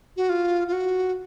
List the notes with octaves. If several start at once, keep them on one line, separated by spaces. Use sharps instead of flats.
F#4
F4
F4
F#4